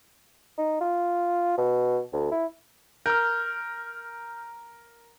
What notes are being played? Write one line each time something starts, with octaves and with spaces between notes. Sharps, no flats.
D#4
F4
B2
D2
E4
A#4 F6 G6